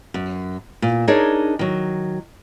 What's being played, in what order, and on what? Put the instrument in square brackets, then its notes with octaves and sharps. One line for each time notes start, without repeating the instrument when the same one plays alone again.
[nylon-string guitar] F#2
A#2
D4 D#4 G#4 A#4 C#5 D#5
D#3 F#3